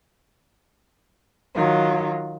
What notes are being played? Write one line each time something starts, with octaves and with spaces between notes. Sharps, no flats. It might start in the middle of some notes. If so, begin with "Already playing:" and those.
D#3 F#3 F4